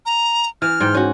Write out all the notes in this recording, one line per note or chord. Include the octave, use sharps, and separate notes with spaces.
A#5
E3 F6
G#2 G5
C#4 F#4